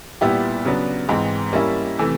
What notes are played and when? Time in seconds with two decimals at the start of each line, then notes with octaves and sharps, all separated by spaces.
0.21 A#2 G3 B3 E4 G4
0.65 C#3 F#3 B3 D4
1.09 G#2 E3 G#3 C4
1.53 G3 A#3 C#4 E4
1.98 C3 E3 A3